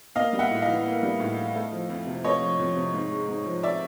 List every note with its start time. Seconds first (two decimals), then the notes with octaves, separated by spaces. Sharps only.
0.15 A#3 D#5 F5
0.33 G3
0.39 E5 F#5
0.51 A2
0.62 D#5 F5
0.68 E3
0.86 A#3
1.03 G3
1.20 A2
1.37 E3
1.55 A3
1.72 F3
1.89 F2
2.07 C3
2.24 A3 C#5 D#5
2.42 F3
2.59 F2
2.76 C3
2.94 G#2
3.11 G#3
3.29 G#2
3.46 F3
3.63 D5 E5